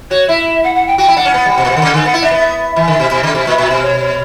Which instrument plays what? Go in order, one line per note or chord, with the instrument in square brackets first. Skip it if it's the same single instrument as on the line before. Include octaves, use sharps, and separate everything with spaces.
[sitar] F#4 [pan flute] C#5
[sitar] E4 [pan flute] E5
[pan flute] F#5
F#5
G5
[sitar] F#4 [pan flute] G5
[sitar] E4
[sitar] D4 [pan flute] F#5
[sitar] C#4
B3
G3
B2
A#2
B2
D3
C#3
D3
[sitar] B3 [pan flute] F#5
[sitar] E4
[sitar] D4 [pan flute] E5
[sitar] B3
[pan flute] E5
[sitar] E3 [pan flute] E5
[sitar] D3
[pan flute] E5
[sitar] B2
B2
C#3
B2
A#2
A#2
B2
[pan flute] C#5
C#5